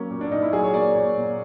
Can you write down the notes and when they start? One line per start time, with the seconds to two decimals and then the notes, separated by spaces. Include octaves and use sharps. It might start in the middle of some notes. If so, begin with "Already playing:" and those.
Already playing: F#3 A#3 C#4
0.10 A#2
0.21 D4
0.31 A#2 D#4
0.43 E4
0.53 F#3 G#4
0.64 C#5
0.74 A#3 D5
0.95 A#2 C#5
1.17 A#2